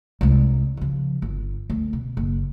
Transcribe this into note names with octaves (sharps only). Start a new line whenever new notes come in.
C2 G#3
C#3 F3
G1
D2
B2
F#1